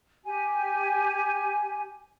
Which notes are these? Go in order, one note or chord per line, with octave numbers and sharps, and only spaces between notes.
G4 G#5